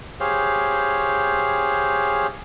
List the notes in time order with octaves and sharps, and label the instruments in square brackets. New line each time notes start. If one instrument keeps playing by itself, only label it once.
[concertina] G4 G#4 C5 C#5 F5